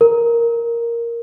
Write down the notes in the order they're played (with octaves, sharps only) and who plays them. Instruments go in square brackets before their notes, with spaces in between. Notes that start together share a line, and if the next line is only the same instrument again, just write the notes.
[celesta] A#4